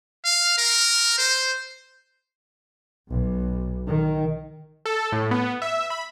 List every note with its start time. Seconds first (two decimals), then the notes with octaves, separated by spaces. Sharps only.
0.25 F5
0.58 A#4
1.18 C5
3.08 B1
3.87 D#3
4.86 A4
5.12 A2
5.31 B3
5.62 E5
5.90 B5